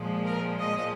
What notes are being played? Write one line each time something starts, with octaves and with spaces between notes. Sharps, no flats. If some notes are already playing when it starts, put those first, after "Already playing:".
Already playing: A#2 F3 G#3
A#4
D#5